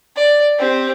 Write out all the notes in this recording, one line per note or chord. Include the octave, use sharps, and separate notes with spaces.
D5
C4 G4